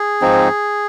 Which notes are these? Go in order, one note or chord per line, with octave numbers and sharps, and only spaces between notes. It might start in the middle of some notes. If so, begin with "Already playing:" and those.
Already playing: G#4
G#2 F3 C4 D#4